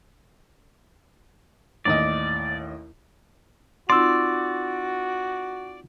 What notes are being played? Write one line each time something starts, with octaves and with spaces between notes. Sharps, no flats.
A1 D#2 D5 D#5
C4 D#4 F4 F#4 D5 C6 E6